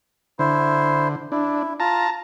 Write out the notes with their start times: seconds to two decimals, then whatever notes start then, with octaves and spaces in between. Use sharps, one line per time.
0.39 D3 E4 C5
1.32 D4 E4
1.80 F4 A5 A#5